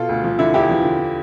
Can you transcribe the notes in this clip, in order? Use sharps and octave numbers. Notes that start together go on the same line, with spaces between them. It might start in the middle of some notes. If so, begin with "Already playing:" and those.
Already playing: B2 F4 A4
D2
F3
D3 E4
E2 E4 G4
F3
D3